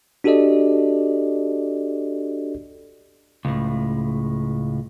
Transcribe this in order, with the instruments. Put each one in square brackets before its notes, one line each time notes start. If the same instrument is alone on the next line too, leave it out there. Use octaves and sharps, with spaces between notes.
[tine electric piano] D4 F#4 G4 A4 D5 D#5
[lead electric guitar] C#2 A2